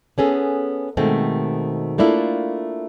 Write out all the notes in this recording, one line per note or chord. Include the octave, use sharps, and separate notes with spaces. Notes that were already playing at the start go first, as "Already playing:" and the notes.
B3 C#4 G#4 A4
B2 D#3 G#3 A3 C4
A3 A#3 D4 E4 F4 A4